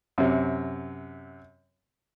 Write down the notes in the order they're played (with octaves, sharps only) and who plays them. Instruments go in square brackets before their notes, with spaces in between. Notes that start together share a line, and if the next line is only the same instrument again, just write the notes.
[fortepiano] F#2 C3